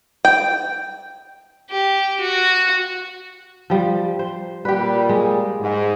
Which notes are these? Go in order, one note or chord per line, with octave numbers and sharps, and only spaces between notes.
G5
G4
F#4
F3 G3
C5
A#2 G3 G4 B4
G#3
G#2